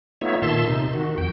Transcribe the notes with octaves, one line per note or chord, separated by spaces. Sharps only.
A3 B3 D#4 F4 C#5 E5
A#2 D#3 E5 A5 C6
C3 D#4
D#3 F#4
F2 G5